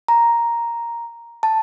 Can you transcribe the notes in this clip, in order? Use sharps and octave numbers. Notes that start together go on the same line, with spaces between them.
A#5
A5